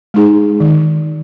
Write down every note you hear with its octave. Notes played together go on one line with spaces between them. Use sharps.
G#3 D#4 G#4
D#3